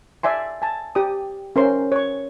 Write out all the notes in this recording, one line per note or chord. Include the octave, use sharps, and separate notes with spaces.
D5 E5 G#5 C6
G#5 A5
G4 D5 D#6
C#4 A#4 C5 C6
C#5 C#6